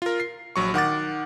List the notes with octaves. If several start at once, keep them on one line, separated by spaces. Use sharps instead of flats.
F4 A#4
C7
A#1 F#3 C#6
D#3 F#5 D6 A6